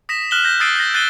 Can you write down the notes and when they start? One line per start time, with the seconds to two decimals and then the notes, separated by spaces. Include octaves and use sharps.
0.09 D#6 A#6 B6 E7
0.31 F6 F#6 E7 F#7 G7
0.44 G6 A#6
0.60 D#6 E6 A6 C7 D7 D#7
0.76 G6 A#6
0.94 F#6 A6 C7 D#7 G7